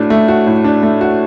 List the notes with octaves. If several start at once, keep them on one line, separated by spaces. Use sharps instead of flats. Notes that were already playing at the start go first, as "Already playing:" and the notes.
Already playing: A2 A3 D4 F#4
A3
F#4
A2
D4
A3
F#4